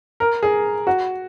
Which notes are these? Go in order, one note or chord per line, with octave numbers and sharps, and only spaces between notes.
A#4
G#4
F#4